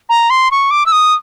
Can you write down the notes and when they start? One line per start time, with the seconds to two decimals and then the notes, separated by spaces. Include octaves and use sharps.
0.09 A#5
0.30 C6
0.51 C#6
0.71 D6
0.86 E6
0.92 D#6